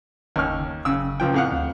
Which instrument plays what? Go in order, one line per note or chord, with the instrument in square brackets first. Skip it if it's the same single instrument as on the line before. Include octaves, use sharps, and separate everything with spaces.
[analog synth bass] F#1 [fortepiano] D#2 C#4 F6
[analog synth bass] F#1 [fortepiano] C#3 E6
[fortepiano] C#2 F3 G5
[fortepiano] F2 F5 F#5 [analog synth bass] A2
[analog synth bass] D2